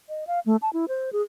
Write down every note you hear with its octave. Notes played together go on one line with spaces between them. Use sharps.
D#5
F5
A3
A5
E4
C5
G#4